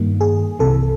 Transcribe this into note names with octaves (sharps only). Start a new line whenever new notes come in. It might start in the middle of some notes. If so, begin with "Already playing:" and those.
Already playing: G2 D#3 G3 A#3
G#4
C2 C3 E3 A4